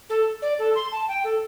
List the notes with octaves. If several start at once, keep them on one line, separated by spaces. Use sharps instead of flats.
A4
D5
A4
C6
A5
G5
A4